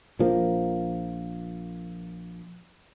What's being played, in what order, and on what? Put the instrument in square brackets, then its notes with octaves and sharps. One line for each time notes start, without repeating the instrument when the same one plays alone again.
[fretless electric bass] A#1 F3 A#3